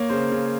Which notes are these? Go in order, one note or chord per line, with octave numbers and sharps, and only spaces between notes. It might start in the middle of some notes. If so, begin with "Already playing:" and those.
Already playing: A#3 C#5
C#3 C5
C#3